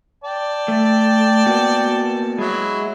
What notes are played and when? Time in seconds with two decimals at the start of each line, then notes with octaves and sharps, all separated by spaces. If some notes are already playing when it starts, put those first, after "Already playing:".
0.24 D5 G5 A5
0.68 A3
1.46 A#3 B3 F#4
2.39 F#3 G#3 E4